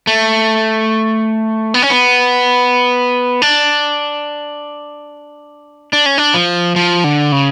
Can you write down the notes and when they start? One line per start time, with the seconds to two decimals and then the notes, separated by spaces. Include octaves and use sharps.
0.07 A3
1.74 B3
1.82 C#4
1.90 B3
3.42 D4
5.93 D4
6.06 C#4
6.18 D4
6.34 F3
6.76 F3
7.04 D3
7.32 C#3